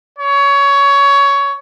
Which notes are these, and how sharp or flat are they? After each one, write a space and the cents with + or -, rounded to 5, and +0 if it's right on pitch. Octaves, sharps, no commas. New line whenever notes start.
C#5 +20